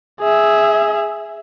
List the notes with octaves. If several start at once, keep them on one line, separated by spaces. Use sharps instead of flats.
G#4 E5